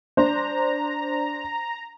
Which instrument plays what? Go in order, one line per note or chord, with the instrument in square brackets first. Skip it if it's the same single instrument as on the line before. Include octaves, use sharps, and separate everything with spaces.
[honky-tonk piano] D4 C5 [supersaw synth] A#5